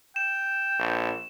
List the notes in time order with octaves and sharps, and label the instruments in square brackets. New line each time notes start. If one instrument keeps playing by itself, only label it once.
[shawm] G5 [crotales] E7
[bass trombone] A#1